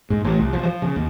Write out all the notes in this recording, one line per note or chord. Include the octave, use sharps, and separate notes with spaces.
G#2
A1
C2
F3
F3
C#3
D#2